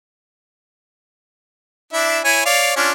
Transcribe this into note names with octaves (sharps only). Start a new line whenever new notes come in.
D4 E4 E5
E4 C#5 G#5
C#5 D5 F5
C#4 D4 F4